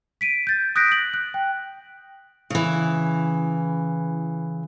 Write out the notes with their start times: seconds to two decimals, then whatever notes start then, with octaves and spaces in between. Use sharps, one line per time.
0.21 B6 D7 D#7
0.47 G6 A6
0.76 D#6 F#6 G6 A#6 B6 D7
0.92 F#7
1.14 F#6
1.34 G5
2.50 C#3 E3